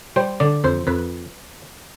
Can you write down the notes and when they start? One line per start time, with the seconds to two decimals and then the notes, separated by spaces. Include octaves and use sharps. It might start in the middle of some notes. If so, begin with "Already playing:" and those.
0.16 G3 C5
0.40 D3 D5
0.64 F2 C5
0.87 F2 B4